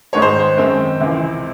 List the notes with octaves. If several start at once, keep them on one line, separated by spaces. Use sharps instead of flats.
G#2 D#3 G#3 D#4 C#5
C5
C5
F#2 D#3 G#3 C4
C#2 C3 E3 G#3